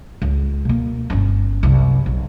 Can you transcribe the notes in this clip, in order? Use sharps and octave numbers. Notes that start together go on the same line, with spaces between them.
C#2
B2 A#3
G1 C#4
C2 F#2
B1